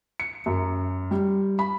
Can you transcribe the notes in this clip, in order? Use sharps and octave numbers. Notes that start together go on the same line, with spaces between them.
C#7
F#2
G3
B5